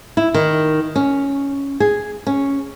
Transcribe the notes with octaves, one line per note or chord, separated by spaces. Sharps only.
E4
D#3
C#4
G#4
C#4